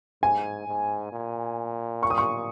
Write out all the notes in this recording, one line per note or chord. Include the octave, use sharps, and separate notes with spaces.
G#2 G#5
G#2
A#2
C#6
D#6
C#6